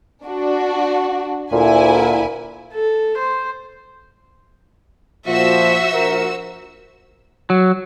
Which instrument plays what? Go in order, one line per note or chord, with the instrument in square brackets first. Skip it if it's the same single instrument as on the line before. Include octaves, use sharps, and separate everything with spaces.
[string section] D4 F#4
[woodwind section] D2 A#2 [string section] E4 G#5
[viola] A4
C5
[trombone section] A#2 F3 [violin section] F#4 C5 E6 [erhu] E5
[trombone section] A#1 A#4
[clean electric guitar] F#3